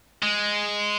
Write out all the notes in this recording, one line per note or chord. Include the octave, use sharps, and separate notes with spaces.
G#3